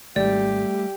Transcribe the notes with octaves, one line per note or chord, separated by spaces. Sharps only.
G#1 G3 A3 G4 D5